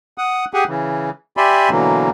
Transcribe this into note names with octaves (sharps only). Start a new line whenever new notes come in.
F#5 D#6
G4 G#4 F#5 G#5
C#3 E3
G4 D5 E5 G#5 B5 C6
B2 D3 E3 F#3 A#3